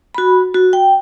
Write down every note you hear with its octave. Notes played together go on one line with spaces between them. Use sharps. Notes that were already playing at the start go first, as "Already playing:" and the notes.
F#4 B5
F#4
G5